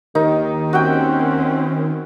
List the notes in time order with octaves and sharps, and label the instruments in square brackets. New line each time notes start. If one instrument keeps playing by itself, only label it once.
[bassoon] D#2 [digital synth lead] D#3 [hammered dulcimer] D#4
[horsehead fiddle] C4 C#4 [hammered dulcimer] F#4 E5 G5